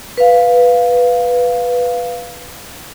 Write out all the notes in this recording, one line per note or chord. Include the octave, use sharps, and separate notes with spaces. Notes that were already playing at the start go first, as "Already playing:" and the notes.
B4 F5